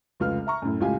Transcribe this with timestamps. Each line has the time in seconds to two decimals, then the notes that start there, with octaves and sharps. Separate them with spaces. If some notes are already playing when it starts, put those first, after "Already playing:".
0.20 F1 C#2 F4 B4 F6
0.47 E5 A#5 C#6
0.62 F#2 A2
0.80 C#2 A2 F4 G4 G#5